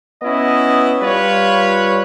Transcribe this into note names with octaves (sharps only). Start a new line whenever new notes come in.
B3 C#4 E4 D#5
G3 F4 B4 C#5